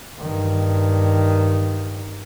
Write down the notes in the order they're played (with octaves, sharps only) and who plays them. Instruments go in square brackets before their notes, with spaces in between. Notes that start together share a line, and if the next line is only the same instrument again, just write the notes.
[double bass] G2 D#3